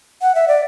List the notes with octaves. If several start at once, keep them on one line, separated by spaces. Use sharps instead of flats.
F#5
E5
D5